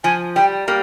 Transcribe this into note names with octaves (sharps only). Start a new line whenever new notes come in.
F3 G#5
G3 G5
G3 A#3